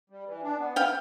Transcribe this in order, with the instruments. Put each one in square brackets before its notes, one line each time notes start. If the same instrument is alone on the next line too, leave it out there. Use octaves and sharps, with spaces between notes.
[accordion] G3
E3
D4
B3
[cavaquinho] F5 G5